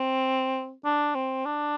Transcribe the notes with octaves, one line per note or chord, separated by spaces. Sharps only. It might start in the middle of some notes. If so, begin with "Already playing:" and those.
Already playing: C4
D4
C4
D4